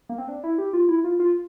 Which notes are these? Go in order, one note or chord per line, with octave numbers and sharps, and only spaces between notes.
A#3
C4
D4
E4
G4
F4
E4
F4
F4